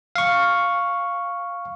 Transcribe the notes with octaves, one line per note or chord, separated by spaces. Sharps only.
F5 C#6